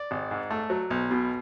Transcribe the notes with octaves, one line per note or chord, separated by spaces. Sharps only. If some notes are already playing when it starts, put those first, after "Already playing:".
Already playing: D5
G#1
G#2
A3
F#3
B1
B2